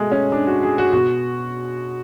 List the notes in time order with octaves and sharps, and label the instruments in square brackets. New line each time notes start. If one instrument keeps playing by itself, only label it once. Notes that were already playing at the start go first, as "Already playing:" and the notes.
Already playing: [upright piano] B2 G#3 A3
C#4
D4
F#4
G#4
F#4
B2 F#4